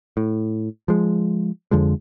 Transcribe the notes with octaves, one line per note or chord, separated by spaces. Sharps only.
A2
F3 G#3
F2 D3 F3 G#3